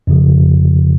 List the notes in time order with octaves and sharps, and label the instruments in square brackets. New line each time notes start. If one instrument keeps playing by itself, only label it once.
[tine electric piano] F2 C#3 F3